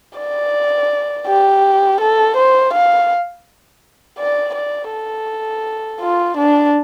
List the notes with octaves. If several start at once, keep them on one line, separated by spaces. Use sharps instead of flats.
D5
G4
A4
C5
F5
D5
D5
A4
F4
D4